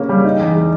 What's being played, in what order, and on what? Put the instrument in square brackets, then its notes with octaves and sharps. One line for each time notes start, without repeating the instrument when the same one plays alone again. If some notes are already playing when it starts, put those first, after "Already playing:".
Already playing: [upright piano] C#3 A#3 C#4
G3
D#4
E2
G#3